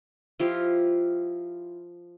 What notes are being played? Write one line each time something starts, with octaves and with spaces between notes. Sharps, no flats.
F3 E4 F4 G4